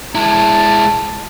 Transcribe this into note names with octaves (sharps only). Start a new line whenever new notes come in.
G#3 E4 A5